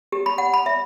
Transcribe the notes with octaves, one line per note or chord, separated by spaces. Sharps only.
G4
B5
F#5
B5
E5